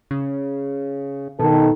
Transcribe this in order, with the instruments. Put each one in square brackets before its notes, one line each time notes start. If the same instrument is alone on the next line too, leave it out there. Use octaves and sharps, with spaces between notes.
[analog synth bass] C#3
[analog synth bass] B2 [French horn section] D#3 A4